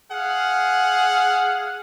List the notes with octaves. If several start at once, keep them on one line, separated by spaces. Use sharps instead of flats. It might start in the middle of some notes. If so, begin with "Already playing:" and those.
G#4 F5 F#5